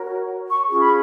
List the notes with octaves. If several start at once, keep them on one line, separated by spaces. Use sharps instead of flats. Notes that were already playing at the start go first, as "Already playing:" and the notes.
Already playing: F#4 A#4 C#5
C#6
C#4 F4 G#4 C#6
B5